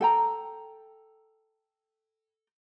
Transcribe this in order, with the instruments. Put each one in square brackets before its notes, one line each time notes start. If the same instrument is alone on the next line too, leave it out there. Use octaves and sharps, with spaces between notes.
[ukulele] A4 G5 A#5